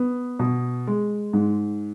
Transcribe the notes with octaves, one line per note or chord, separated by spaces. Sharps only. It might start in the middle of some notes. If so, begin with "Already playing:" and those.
Already playing: B3
B2
G#3
G#2